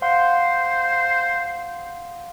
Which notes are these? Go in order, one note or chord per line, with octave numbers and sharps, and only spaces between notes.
C5 F5 F#5 C6